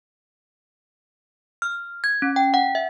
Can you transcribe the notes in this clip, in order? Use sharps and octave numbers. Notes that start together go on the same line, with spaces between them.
F6
G#6
C#4
G5
F#5
E5